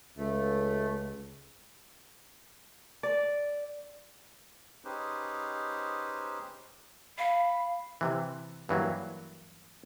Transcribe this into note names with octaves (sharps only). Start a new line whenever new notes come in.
C#2 A3
D5
C#4 D#4 G4 G#4 B4 C5
F5 B5
C3 E3
G2 E3 F#3 A#3